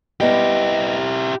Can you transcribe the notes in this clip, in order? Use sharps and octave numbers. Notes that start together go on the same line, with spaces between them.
G3 B3 E4 G4 D#5